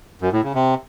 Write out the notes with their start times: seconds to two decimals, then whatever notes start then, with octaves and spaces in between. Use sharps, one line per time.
0.21 F#2
0.33 A2
0.44 C#3
0.55 C3